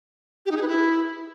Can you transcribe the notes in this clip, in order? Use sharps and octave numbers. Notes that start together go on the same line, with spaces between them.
G4
D#4
G#4
B4
E4